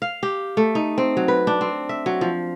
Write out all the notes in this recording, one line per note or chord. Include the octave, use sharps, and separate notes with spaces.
F5
G4
A3
D#4
C4
F#3
B4
D4
C4
E5
F#3
F3